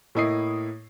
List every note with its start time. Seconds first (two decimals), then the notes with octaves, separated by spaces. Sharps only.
0.15 A2 A#3 E4 D#5 D#6 C7